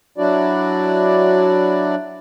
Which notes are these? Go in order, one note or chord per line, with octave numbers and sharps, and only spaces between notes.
F#3 D4 E4 F#4 D5